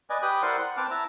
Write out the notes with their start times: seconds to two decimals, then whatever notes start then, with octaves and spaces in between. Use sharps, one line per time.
0.10 B4 D5 D#5 G#5
0.22 G4 B4 G5 B5 D#6 F#6
0.42 E4 A#4 C5 D5 F#5 C6
0.61 F#5
0.77 C4 B4 G5 A5 D6 F6
0.90 E4 E5 A5 A#5